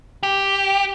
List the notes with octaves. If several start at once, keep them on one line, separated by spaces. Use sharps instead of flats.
G4